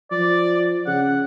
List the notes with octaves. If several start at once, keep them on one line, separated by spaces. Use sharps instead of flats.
F3 D5
C#3 F#5